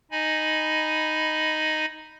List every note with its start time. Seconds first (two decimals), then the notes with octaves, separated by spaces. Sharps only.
0.11 D#4 D#5 G#5 B5